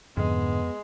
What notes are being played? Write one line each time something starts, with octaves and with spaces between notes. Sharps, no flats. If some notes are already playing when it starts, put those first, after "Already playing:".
F2 G#2 D3 G#3 B3